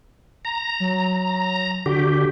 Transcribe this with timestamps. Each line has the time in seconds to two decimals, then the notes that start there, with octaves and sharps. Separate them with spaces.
0.45 A#5
0.80 F#3
1.86 D3 F#4 G4